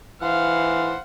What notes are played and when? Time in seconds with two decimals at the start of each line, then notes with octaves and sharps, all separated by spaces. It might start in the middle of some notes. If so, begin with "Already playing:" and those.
0.22 E3 C5 F5 F#5